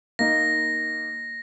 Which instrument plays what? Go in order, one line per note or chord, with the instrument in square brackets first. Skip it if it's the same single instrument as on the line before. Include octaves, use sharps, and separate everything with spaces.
[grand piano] A#3 D#4 [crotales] A#6